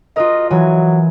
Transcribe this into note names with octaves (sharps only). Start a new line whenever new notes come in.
F4 F#4 A#4 D#5
E3 F#3 G#5